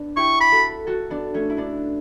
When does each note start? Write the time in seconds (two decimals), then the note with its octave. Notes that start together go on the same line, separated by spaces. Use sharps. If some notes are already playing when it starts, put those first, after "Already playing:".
Already playing: B3 D4
0.16 E4 G4 C#6
0.40 B5
0.52 F#4 A4
0.87 F#4 A4
1.10 B3 D4
1.34 A3 C#4
1.50 E4
1.57 B3 D4